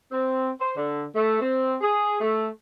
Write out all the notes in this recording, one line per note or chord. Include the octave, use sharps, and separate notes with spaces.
C4
C5
D3
A3
C4
G#4
A3